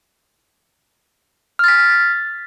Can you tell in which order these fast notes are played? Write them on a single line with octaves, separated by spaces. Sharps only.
F6 A6 B6